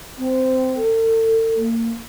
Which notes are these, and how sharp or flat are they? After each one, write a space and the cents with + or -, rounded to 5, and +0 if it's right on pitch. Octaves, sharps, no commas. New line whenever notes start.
C4 -15
A4 +40
A#3 -30